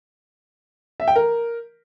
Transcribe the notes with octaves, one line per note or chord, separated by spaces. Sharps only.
E5
G5
A#4